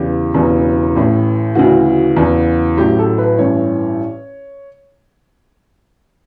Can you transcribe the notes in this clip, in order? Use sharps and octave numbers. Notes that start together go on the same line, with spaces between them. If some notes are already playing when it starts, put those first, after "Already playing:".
Already playing: E2 C#3 E3 G4
E1 E2 C#3 E3
A1 A2 E3
D2 C#3 E3 F#4
E2 C#3 E3
A1 A2 F#3 G4
A4
B4
A1 G2 E3 C#5